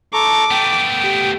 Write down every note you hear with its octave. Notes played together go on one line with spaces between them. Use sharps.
A4 A#5 C#6 D6
A3 B3 G5
G4